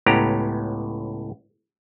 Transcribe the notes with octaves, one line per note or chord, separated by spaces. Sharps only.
C#2 A2 B3 C#4 G4 A#5